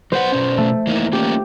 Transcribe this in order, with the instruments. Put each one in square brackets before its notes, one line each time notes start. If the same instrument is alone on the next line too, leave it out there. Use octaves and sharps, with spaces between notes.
[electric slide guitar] F#3 B4 F#5 [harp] C5
[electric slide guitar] B2 C#4
[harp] A3
[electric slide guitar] E3 A#3 D#4
[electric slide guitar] A#3 C#4 F4 [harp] G4